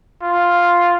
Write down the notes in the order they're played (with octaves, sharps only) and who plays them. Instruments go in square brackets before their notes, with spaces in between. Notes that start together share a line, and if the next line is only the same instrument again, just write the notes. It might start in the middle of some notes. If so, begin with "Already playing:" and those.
[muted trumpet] F4